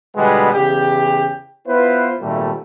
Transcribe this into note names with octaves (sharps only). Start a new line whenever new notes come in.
B2 D3 G3 G#3 B3
E2 C#3 G4
B3 E4 F4 B4 C5
G#1 A#2 G3 A3